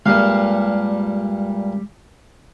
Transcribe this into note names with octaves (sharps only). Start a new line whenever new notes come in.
G2 A#2 G3 G#3 F5